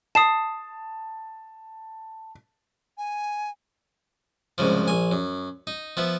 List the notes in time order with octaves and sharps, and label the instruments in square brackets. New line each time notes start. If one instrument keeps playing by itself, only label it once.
[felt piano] A5 [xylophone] D#6 C7 E7
[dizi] G#5
[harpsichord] C2 G#2 C#3 F3
A#1 G#5
F#2
D#4
F3 B3 E5